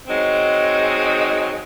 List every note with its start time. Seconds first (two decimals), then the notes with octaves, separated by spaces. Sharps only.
0.07 F#3 G#3 C4 D#4